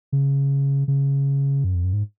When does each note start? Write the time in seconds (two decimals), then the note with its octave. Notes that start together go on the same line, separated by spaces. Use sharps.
0.12 C#3
0.88 C#3
1.64 F#2
1.75 F2
1.84 F#2
1.93 G#2